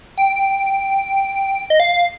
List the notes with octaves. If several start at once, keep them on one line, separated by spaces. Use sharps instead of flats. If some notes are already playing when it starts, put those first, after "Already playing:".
G5
D#5
F5